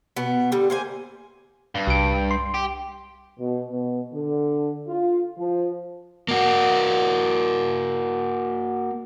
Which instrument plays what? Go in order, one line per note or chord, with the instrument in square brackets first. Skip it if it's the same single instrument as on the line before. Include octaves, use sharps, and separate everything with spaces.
[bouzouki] B2 B3
D3 G3
A#3 C5 G#5
[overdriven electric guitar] G2
[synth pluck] C2 D7
C6
[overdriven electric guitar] G4
[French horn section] B2
B2
D3
F4
F3
[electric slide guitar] A#3 F#4